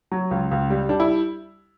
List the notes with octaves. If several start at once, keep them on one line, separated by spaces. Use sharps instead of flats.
F#3
C#2
C#2
G3
G3 D4
E4